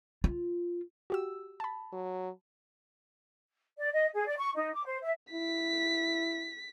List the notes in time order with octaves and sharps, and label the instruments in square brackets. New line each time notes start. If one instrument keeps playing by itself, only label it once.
[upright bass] F4
[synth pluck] F#4 G4 E6
A5 B5
[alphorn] F#3
[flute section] D5
D#5
G#4
D5
C#6
D#4
D6
C5
E5
[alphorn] E4 [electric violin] B6